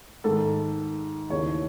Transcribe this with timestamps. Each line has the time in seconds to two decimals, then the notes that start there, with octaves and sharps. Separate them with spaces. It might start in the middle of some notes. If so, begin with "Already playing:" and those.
0.24 G#2 D#3 A4
1.29 D#2 C#3 E3 C#5